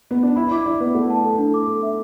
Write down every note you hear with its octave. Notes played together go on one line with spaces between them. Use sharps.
B3
D4
E4 B5
E4 D6
E4 D5
B3 B4
A3 F#5
A5
A4
D4
D6
A4
E5